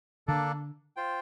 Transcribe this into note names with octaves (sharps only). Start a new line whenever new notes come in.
D3 A#3 D4 A4 D5
F4 C5 G5